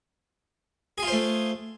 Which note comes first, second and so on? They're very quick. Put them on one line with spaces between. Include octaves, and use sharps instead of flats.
G#4 F4 C5 A3